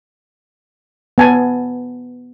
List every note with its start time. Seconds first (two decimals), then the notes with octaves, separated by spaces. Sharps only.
1.18 B3 G#5 A5